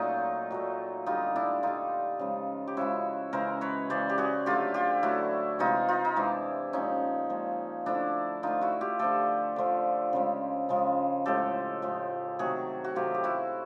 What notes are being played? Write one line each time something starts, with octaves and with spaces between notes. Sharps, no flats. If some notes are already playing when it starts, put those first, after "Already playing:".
Already playing: A#2 F#3 A3 D#4 F4
A#2 F#3 A3
D3 G3 D#4 F4
D4 E4
D3 G3 D#4 F4
C#3 F3 G#3
G4
C#3 F3 G#3 E4 F#4
C#3 E3 G#3 A#4 C5
B4 C#5
C#3 E3 G#3 C5 D5
G4
F#4 G#4
D3 F#3 A3 F4 G4
F4 G4
D3 F#3 A3 E4 F#4
C3 E3 G#3 D#4 F4
D#4 F4
D#4
C3 E3 G#3 D4 E4
A#2 F3 G#3 C#4 D#4
A#2 F3 G#3
D3 F3 A3 D4 E4
D3 F3 A3 D#4 F4
E4 F#4
F4 G4
D3 F3 A3 G4 A4
D3 F3 A3
C#3 F3 G#3
C#3 F3 G#3
A2 F3 G#3 G4 A4
A2 F3 G#3
C3 D#3 F#3 A3 F#4 G#4
F#4
C3 D#3 F#3 A3 F4 G4
G4
E4 F#4